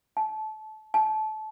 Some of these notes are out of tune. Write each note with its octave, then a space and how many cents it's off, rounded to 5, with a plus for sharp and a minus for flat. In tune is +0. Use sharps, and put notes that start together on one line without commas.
A5 -25
A5 -25